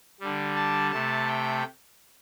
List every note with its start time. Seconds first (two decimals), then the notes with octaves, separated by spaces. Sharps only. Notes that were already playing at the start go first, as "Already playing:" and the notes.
0.20 D3 G3
0.56 A5
0.91 C3 A3 A5
1.27 G5